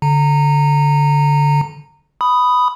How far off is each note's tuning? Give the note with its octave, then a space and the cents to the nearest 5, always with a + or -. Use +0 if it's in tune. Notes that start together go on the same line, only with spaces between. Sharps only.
D3 -20 A#5 -20
B5 +5 D#6 +0